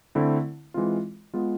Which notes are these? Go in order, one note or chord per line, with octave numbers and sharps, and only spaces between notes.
D3 A3 C4 E4
E3 G#3 C4 F4
G#3 B3 F4 G#4